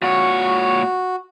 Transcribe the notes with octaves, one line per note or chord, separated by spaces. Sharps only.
A#2 F#4 C#5